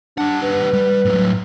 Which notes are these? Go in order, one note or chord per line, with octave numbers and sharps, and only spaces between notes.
G3 D4 F#5
B4
G3
A2 F#3